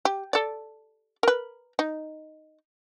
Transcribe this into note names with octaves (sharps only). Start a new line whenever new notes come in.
G4
A4 D5
A#4 B4
D#4